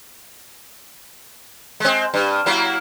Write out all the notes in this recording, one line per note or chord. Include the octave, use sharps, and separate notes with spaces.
G#3 C4
G2
F#3 A#3 E4